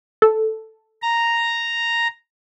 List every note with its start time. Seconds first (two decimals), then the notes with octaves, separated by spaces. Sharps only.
0.22 A4
1.02 A#5